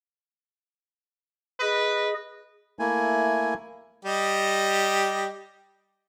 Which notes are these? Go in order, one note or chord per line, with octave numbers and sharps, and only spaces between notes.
G#4 B4 D#5
A3 A#3 E4 G#5
G3 G4 D#5